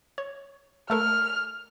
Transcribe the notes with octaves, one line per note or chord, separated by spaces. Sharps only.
C#5
A3 A4 A#4 F6